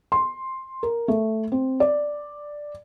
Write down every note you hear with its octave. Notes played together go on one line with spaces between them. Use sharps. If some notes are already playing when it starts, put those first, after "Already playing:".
C6
A#4
A3
C4
D5